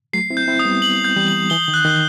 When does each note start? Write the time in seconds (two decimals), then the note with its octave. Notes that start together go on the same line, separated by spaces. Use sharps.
0.13 F#3 A3 C7
0.30 C4 E4
0.37 G6
0.48 C4 E4
0.59 D#6
0.65 G3 B3
0.82 F#7
1.04 G6
1.16 E3 G3
1.28 F#7
1.50 E3 G7
1.68 D#3
1.74 F#6
1.85 D#3